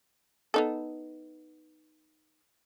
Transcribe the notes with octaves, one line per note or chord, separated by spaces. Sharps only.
B3 D#4 A4